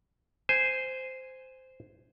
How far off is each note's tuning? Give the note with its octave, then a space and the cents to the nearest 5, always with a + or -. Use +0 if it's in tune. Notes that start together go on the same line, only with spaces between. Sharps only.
C5 -10 G#5 +0